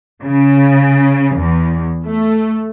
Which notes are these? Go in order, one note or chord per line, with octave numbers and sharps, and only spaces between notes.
C#3
E2
A3